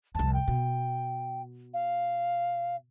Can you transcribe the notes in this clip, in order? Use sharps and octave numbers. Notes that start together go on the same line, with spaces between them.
C2 F2 A5
G5
B2
F5